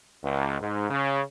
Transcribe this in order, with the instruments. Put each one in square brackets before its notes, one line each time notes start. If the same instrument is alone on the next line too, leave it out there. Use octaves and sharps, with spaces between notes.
[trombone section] C#2
G#2
C#3